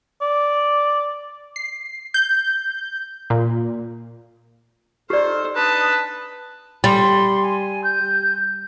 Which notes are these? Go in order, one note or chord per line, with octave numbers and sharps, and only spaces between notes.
D5
C7
G6
A#2
D#4 G4 A4 C5 D5 F6
D4 D#4 B4 A5 D#6
G3 C6
G#5
G6